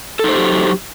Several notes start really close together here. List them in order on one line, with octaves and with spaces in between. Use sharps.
A4 D#4 C5 G4 F#3